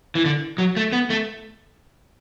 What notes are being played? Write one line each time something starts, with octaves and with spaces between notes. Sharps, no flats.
E3
D3
F#3
A3
B3
A3